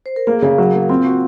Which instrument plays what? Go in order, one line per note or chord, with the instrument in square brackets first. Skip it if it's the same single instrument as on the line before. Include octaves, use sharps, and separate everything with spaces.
[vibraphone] C5
A#4
[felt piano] A#3 [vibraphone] G#4
[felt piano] C#3
F#3
A#3
[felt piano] C4 [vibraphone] F4
[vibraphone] F4 [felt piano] F#4